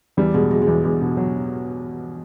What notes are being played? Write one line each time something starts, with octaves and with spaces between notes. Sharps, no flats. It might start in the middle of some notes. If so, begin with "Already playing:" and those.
E2 G3
B2 G#3
F#3 G#3
G#3
E2
E2 G#3
B2
F#3